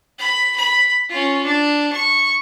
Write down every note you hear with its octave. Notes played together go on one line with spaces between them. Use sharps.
B5
B5
C#4 F4
D4
C#6